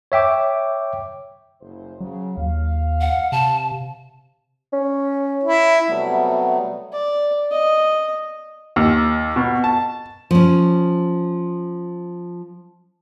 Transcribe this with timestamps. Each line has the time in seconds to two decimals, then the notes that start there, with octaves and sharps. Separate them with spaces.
0.12 C#5 E5 G5 D6
1.61 F#1 C2 C5
2.00 C#3 F#3
2.37 D#2 F5
3.01 F#5
3.32 C3 A5
4.73 C#4
5.43 E4
5.87 C3 F#3 G3 A3 B3
6.92 D5
7.52 D#5
8.76 D#2
9.36 B2
9.64 A5
10.31 F3 C#4